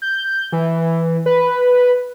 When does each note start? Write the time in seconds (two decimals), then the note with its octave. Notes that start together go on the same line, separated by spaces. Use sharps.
0.02 G6
0.52 E3
1.26 B4